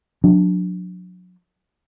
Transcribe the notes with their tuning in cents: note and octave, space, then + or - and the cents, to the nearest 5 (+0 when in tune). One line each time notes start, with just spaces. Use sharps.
F#3 -35 D4 +0